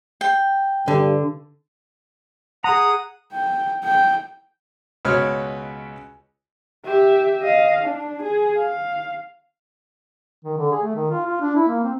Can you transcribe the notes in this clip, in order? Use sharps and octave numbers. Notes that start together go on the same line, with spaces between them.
G5
G2 D3
G#4 F#5 A#5 D#6
G5
G5
C#2 B2 B4 C#5 F6
G4 E5
D#5 F5
D4
G#4
F5
D#3
D3
G#4
A3
D#3
F4
F4
D4
E4
A#3
C4